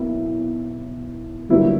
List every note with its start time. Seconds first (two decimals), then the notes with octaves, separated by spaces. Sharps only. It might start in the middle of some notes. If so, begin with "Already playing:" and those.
Already playing: B1 B2 A#3 E4
1.49 G1 G2 F#3 A#3 E4